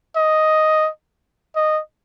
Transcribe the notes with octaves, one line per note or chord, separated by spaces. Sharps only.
D#5
D#5